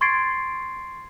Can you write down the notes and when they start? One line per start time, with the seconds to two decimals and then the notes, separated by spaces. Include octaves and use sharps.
0.01 C6 C#6 G#6 A6 C7 D7